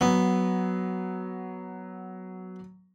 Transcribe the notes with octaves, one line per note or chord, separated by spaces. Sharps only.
F#3 B3